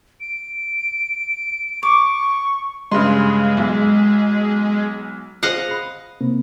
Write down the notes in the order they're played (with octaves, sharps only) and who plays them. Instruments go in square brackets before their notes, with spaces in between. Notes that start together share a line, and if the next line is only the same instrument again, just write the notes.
[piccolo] D7
[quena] C#6 [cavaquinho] D6
[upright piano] G2 C#3 C6 [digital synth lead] G#3
[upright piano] B1
[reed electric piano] F4 G#4 C5 [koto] D#5 F5 F#5
[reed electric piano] B5
C3 A#3 C4